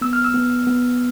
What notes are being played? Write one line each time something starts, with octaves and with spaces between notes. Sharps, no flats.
B3 E6
F6
E6
B3
B3